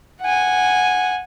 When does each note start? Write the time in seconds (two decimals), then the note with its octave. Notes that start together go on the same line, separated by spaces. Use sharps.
0.21 F#5 G#5